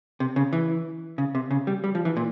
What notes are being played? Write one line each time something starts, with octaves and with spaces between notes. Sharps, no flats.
C3
C#3
E3
C#3
C3
C#3
G3
G3
F3
E3
A#2